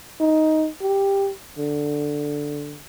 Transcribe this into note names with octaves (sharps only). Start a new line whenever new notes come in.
D#4
G4
D3